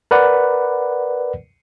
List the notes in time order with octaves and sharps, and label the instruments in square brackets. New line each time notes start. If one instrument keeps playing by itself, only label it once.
[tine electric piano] A#4 B4 D5 F#5